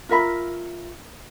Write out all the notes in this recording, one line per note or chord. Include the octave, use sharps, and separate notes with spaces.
F4 A#4 E5 B5